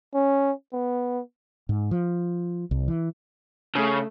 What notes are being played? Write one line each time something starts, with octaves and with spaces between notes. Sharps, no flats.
C#4
B3
G#2
F3
C2
E3
C#3 A3